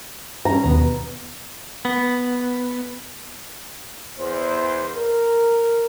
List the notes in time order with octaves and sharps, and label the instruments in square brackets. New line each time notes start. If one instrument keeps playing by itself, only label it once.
[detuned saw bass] G2 [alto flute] C#4 [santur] A#5
[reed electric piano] D#2 [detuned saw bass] B2 [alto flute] B3
[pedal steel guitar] B3
[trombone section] E2 C5
A#4